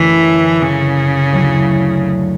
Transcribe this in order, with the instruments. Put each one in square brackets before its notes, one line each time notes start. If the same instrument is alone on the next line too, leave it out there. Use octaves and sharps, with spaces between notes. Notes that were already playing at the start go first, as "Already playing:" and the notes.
Already playing: [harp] F#2 D3 A3 C#4 E4 [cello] E3
[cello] C#3
[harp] D2 D3 F#3 C#4 E4